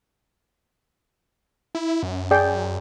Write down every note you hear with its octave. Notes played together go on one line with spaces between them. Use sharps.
E4
F#2
G#4 D5 G5